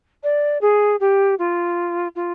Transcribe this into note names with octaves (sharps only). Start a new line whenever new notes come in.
D5
G#4
G4
F4
F4